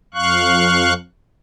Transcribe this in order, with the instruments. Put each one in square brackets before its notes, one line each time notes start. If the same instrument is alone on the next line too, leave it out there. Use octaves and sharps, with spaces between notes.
[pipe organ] F2 F5 C#6 F#6